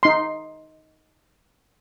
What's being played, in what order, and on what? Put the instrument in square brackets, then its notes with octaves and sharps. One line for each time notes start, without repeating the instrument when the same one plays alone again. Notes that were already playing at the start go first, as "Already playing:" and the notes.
[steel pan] D#4 C6